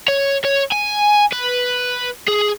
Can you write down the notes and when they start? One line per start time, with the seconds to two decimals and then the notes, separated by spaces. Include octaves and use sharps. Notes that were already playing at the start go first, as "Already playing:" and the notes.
0.08 C#5
0.45 C#5
0.72 G#5
1.32 B4
2.28 G#4